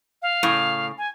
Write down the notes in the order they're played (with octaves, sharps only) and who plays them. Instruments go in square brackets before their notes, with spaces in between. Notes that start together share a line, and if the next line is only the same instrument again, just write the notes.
[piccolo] F5
[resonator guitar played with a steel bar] A2 C#3
[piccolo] G#5